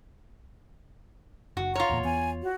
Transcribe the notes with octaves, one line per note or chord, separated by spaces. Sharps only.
F#1 F#4
F4 C#5 A#5
D1 E2 A#2
E2 B3 G#5
F#4